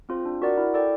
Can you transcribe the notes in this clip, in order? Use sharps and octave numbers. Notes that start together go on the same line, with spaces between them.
C4 F4 G#4 C5
D4
F#4 A#4 D5 F#5
E4
A4 D5 G5